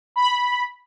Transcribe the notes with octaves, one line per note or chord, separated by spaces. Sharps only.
B5